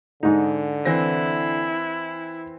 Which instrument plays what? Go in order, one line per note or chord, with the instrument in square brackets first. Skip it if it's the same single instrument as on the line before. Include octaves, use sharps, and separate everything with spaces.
[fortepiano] G#2 D#4 [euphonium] D3
[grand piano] E3 C4 A#6 [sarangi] E4